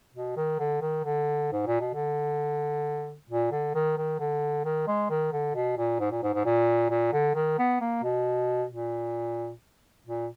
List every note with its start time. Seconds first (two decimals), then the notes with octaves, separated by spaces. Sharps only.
0.14 B2
0.36 D#3
0.59 D3
0.81 D#3
1.04 D3
1.52 G#2
1.67 A#2
1.80 B2
1.94 D3
3.29 A#2
3.52 D3
3.74 D#3
3.97 D#3
4.19 D3
4.65 D#3
4.87 G#3
5.10 D#3
5.32 D3
5.55 B2
5.77 A#2
6.00 G#2
6.11 A#2
6.23 G#2
6.34 G#2
6.45 A#2
6.90 A#2
7.13 D3
7.35 D#3
7.59 B3
7.81 A#3
8.03 B2
8.70 A#2
10.06 A#2